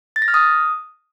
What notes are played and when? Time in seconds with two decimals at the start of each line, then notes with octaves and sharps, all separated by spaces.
0.16 A6
0.22 A#6
0.28 F6
0.34 D#6